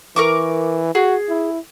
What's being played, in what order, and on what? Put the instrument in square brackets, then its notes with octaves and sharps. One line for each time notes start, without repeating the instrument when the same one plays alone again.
[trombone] E3 [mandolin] A#4 C#6 D6
[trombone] F#4 [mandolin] G#4
[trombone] E4